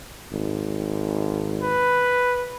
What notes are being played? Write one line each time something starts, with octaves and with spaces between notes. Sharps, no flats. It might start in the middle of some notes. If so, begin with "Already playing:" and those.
G#1
B4